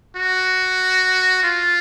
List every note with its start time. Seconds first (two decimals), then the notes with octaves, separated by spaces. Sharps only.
0.16 F#4
1.43 F4